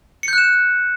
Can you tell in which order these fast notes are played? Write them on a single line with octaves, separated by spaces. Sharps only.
C#7 G6 F#6 E7